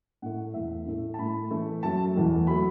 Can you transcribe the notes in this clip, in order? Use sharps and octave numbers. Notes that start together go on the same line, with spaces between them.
A2 A3 F#5
E2 E3 A3 E5
A2 A3
A5
A2 A3 B5
A2 E3 A3
F#2 F#3 A3 A5
E2 E3 A3
F#3 A3 B5